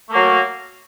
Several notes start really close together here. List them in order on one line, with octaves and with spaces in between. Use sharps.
A3 A#3 F#3